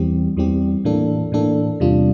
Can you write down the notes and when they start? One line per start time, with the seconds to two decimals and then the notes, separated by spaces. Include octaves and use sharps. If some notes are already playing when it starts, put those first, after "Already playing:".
Already playing: E2 E3 G3 C4 G4
0.37 E2 E3 G3 C4 G4
0.85 A2 E3 A#3 D4 A4
1.32 A2 E3 A#3 D4 A4
1.80 E2 C3 G3 D4 F4